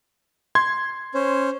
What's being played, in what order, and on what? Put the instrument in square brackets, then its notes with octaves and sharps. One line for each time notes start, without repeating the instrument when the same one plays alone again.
[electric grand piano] C6 G#6
[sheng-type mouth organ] C#4 C5